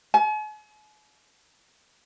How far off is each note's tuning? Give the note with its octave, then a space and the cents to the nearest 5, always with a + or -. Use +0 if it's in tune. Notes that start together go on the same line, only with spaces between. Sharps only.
G#5 +45